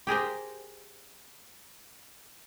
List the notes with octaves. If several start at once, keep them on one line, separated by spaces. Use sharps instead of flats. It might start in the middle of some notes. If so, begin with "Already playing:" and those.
G4 G#4 A#4 C5